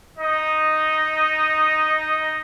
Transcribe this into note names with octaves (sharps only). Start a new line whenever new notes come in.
D#4 D#5